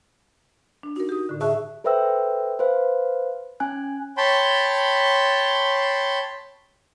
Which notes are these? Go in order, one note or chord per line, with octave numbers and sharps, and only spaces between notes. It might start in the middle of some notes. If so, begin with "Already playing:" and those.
D4
D#4 F#4 A#4
G4 D#6
A2 D3
G#4 E5 A5 C#6 F#6
A4 B4 C5 E5 G5 E6
B4 C5 F5
C#4 G#5 F#6
C#5 G5 A5 B5 C6